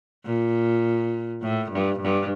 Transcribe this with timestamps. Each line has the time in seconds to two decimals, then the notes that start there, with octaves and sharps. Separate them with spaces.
0.25 A#2
1.42 A2
1.71 G2
2.00 G2